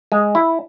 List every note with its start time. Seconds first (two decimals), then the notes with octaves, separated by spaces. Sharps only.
0.12 G#3
0.35 E4